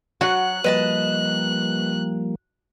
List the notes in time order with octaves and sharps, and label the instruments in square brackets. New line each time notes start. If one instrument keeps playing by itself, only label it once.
[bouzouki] F#3 F#5 [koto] F#4 [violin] F#6
[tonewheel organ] F3 G3 A#3 [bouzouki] B4 D#5 A5